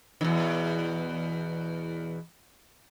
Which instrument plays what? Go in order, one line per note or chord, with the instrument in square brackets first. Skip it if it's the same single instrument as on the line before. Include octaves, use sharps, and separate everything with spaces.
[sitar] E2 B2 D#3